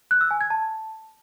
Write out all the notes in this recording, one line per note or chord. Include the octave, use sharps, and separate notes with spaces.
F#6
E6
G#5
G#6
A5